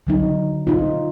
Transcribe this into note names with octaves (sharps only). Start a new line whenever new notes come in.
D3 F#3 D#4
D#4 F4